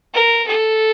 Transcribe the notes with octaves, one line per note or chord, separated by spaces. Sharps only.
A#4
A4